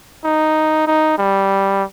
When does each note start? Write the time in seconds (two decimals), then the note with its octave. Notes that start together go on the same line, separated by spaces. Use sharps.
0.24 D#4
0.87 D#4
1.18 G3